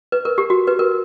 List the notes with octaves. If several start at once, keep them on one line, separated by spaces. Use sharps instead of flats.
B4
A#4
G4
F#4
B4
A#4